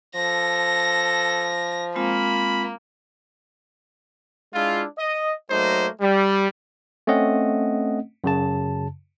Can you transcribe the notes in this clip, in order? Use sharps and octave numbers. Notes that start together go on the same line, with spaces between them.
F3 A4 A#6
G#3 A#3 C4 F4 B5
G#3 D4 E4 F4
D#5
F#3 A3 A#3 D#4 C5
G3
A3 C4 C#4 D#5 F#5
F#2 C#3 A5